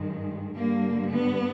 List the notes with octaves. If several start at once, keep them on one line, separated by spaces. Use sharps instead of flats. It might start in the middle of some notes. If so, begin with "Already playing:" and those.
Already playing: G2 D#3 G#3
G2 D3 G3 A#3
B3